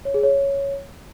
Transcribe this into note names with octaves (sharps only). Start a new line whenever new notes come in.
C#5
G#4
C#5